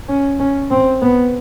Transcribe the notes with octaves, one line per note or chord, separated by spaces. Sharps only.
C#4
C#4
C4
B3